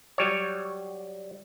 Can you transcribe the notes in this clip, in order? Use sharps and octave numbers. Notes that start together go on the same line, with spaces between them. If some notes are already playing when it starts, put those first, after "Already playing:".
F#3 G3 C#5